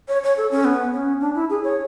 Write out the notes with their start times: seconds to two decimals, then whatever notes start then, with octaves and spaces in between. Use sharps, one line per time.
0.08 C#5
0.23 C#5
0.37 A4
0.51 C#4
0.65 B3
0.94 C#4
1.21 D4
1.35 E4
1.50 G#4
1.64 C#5